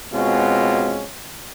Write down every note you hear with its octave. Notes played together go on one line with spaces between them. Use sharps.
B2 G#3 C4 C#4 F4 F#4